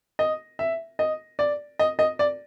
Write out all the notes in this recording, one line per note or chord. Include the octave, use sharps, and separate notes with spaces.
D#5
E5
D#5
D5
D#5
D#5
D5